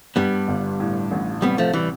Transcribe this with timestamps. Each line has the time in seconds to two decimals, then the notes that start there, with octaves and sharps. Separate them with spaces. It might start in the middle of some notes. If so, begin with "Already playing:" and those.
0.16 G2 G3 B3
0.48 G1
0.80 A2
1.11 A1
1.42 C3 G3 B3
1.58 F3 A3
1.73 E3 G3